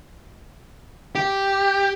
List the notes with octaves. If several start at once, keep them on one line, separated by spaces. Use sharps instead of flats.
G4